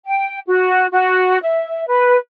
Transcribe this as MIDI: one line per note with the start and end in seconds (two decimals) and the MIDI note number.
0.05 0.39 79
0.47 0.86 66
0.92 1.38 66
1.42 1.86 76
1.87 2.16 71